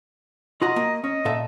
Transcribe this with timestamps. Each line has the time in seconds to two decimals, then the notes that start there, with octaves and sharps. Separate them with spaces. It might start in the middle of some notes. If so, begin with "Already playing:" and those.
0.62 F4 F#4 D#5 A#5
0.76 A#3
1.04 C#4 D#5
1.25 A#2 A4 E5